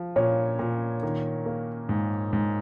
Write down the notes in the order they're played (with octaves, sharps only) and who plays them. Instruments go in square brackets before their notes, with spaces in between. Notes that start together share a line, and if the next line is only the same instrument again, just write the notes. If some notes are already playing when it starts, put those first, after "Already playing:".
Already playing: [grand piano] F3
[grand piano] A#2 [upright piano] C#5
[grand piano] A#2
D#3
A#3
G#2
G#2